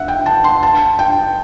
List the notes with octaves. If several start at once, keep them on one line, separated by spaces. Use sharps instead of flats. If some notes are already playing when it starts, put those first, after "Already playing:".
Already playing: E5 F#5
G5
A5
C6
A5
G5